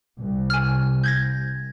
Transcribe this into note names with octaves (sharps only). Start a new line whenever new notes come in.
C2
G#5 F6
G6 G#6 A#6